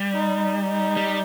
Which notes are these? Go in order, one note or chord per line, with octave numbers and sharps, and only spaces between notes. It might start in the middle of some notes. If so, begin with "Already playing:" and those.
Already playing: G3
D#4
D#4
G3